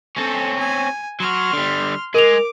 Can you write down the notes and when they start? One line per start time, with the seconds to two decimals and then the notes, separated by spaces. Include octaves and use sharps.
0.17 C4 C#4 A4
0.59 G#5
1.20 F#3 F#4 C6 F6
1.53 D3 G3
2.15 G#3 A#4 D6 F7